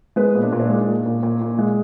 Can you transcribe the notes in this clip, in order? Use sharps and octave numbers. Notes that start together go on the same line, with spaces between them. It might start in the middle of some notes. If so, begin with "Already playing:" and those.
G#3 B3 B4
A#2
D4
A#2
D4
G#3 D#4
A#2
A#2
A#2
A#2
G#3